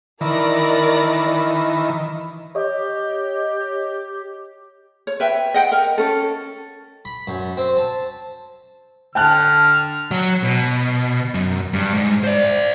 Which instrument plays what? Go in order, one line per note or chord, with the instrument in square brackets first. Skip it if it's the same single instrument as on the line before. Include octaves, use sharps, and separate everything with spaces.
[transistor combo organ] D#3 E3 [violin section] A#4 D5 A#6
[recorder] G4 [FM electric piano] C#5 D#5
[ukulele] C#5
B4 E5 G5
D#5 F#5 G5
A#4
C#4 A4
[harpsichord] B5
F#2
C4
A5
[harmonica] D3 F6 [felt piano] G5 A5 F#6
[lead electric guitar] F#3
B2
F#2
G2
G#2
C5 D5